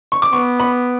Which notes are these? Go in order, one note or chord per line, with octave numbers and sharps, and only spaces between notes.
C#6
D6
B3 C#6
B5